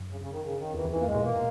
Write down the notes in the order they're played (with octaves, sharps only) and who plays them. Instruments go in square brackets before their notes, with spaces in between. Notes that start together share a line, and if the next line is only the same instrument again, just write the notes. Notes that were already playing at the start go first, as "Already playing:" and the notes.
Already playing: [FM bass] F#2
[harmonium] C#3
C#3
D#3
C#3
D#3
[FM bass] E2 [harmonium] E3
[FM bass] E2
[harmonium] E3
[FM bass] E2
[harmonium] A#3
[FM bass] F#2 [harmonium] G#3
[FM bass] A#2
[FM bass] B2 [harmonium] A#3
[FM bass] A#2